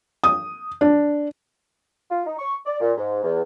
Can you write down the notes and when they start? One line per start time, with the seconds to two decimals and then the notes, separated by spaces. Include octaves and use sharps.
0.24 D#6
0.81 D4
2.11 F4
2.26 D#4
2.39 C#6
2.66 D5
2.81 A#2
2.98 G#2
3.24 E2